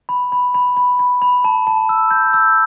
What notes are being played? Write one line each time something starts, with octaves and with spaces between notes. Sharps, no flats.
B5
B5
B5
B5
B5
B5
A5
A5
E6
G6
E6